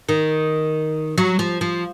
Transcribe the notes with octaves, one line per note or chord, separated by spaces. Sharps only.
D#3
F#3
F3
F3